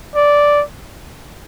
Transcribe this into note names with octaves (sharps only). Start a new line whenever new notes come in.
D5